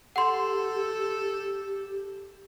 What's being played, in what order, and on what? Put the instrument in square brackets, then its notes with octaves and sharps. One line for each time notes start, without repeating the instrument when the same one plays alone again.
[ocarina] G4 [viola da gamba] A4 [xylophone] F#5 C6